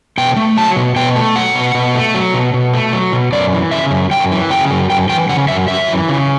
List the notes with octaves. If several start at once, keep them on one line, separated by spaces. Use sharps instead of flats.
B2 G5
A3
F#3 A5
B2
B2 G5
A3
F#3 F#5
B2
B2
A3
F#3
B2
B2
A3
F#3
B2
F#2 D5
E3
C#3 E5
F#2
F#2 G5
E3
C#3 G5
F#2
F#2 G5
E3 G5
C#3 F#5
F#2 E5
F#2 E5
E3
C#3